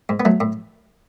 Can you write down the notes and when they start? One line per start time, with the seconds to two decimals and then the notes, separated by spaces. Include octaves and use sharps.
0.09 G#2
0.20 B3
0.25 F#3 A3
0.40 A2